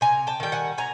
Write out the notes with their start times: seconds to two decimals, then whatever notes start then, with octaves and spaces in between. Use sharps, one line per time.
0.01 C3 G#5 A#5
0.27 G5 A5
0.40 D#3 G3 G5
0.52 F#5 G#5
0.78 C3 G#5 A#5